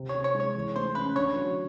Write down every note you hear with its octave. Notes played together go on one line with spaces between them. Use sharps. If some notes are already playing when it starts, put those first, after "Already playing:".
Already playing: C3
C#5
C3
C#5
G#3
C#5
E3
A3 C5
C#4 B4
D3 C#5
F#3